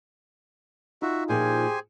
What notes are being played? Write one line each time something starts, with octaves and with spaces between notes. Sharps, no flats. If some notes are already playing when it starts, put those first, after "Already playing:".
D#4 F4 F#4 E5
A#2 F3 G4 G#4 C5 G#5